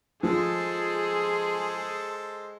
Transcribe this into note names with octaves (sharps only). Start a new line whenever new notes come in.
F3 G#3 G#4 A4 C5